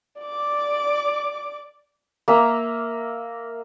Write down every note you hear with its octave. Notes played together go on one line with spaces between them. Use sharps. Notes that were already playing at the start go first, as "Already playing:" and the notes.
D5 D6
A#3 E5 A#5 E6